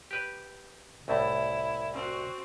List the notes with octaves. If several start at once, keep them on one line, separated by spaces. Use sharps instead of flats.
G4 B4
C2 A2 A3 E4
C4 F#4